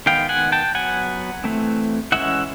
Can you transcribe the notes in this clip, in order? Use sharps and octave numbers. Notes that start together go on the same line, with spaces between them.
D#3 G#3 B3 F5 G5
F#5 G#5
G5 A5
F#3 B3 F#5 G#5
E3 A3 C4
E3 G#3 C#4 E5 F#5